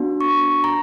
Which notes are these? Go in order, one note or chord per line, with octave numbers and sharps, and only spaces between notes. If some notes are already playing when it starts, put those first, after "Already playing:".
Already playing: B3 D4 F#4
C#6
A#5